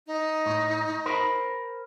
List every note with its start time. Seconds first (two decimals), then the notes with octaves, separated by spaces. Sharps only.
0.07 D#4
0.46 A2
1.06 A#4 C5 B5